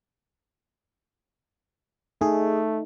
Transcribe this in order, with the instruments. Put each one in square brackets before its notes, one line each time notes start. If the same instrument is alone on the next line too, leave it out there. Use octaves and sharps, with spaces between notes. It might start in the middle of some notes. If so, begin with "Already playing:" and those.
[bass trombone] A3 [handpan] D#4 [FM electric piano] G#4